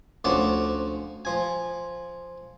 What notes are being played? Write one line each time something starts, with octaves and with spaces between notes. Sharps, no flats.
D2 F3 C#4 D5 F#5 A5
F3 G#5